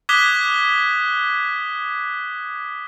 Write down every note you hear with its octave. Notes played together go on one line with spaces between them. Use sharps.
D6 D#6 F#6 G#6 B6 G7